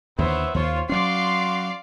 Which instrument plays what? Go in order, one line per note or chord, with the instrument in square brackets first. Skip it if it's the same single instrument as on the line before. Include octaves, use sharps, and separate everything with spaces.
[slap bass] D#2 D3 [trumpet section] B3 E4 E5 [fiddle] C5 C#5
[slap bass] D#2 [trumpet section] F4 [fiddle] C5 C#5
[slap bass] F#3 C#4 [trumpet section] F#4 C6 [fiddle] D5 F5 [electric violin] D6 C7